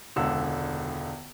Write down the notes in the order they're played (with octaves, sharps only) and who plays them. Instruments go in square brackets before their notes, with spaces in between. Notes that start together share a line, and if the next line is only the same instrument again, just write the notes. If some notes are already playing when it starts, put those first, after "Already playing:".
[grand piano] E1 C#2 D3 E6